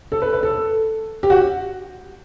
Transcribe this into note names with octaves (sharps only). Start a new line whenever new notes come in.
A4
B4
B4
A4
G4
F#4